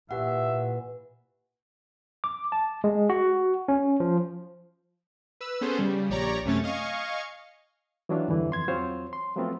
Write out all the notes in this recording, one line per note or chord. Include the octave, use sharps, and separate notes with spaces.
A#2 E3 G4 E5 F#5
D6
A5
G#3
F#4
C#4
F3
B4 E6
B3 C#4 G#4 A4 C5
C#3 G3
A#1 G4 C#5 D5 A#5
F#2 C3 A3 C#4 C#5 A6
D#5 F5 G#5 C#6
E3 F#3 D4 F4
E2 G2 D3 E3
F2 C6 G#6
E2 F#3 C4 F4 C5 C#5
C6
F3 F#3 A3 B3 C4 F4